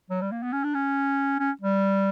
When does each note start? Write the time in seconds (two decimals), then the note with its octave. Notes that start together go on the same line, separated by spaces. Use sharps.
0.10 F#3
0.22 G3
0.32 A#3
0.43 B3
0.53 C#4
0.64 D4
0.75 C#4
1.40 C#4
1.61 G3